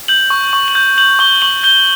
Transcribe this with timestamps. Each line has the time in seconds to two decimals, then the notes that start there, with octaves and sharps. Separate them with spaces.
0.08 G6 F#7
0.30 C#6
0.53 C#6
0.68 F#7
0.75 G6
0.98 G6 F#7
1.19 C#6 G7
1.42 C#6 F#7
1.63 G6 G7